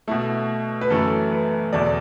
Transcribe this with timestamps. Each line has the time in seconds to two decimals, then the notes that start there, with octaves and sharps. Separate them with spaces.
0.08 B2 A3 E4
0.81 B4
0.90 F#2 E3 A3 A4
1.32 B4
1.73 E2 B2 A3 D5